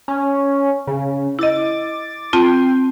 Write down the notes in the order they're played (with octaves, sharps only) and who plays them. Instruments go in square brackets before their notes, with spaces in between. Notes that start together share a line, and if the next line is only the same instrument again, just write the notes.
[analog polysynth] C#4
C#3
[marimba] E4 D#5 [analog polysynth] D6 A6
[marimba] C4 F4 A5 [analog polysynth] G5 C6